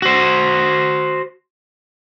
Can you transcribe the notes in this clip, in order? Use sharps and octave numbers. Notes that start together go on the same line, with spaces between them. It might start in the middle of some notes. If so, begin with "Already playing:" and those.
F#4 C5